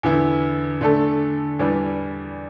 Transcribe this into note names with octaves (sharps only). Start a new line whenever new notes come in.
E2 D3 B3 E4
D3 A3 D4 A4
E2 E3 G3 D4 B4